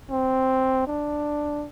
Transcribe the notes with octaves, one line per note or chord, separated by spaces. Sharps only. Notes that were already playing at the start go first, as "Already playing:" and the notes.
C4
D4